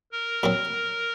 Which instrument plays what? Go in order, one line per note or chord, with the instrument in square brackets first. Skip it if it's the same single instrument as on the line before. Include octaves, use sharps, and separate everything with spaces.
[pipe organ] A#4
[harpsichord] A#2 F#3 C4